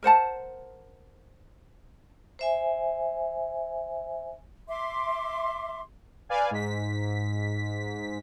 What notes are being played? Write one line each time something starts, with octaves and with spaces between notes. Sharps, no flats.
A#4 C5 F#5 A5
C5 E5 G#5
E5 C6 D6
B4 D5 F5 G#5
G#2 B6